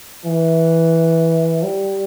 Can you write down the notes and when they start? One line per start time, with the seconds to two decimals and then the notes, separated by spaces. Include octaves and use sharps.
0.25 E3
1.63 G3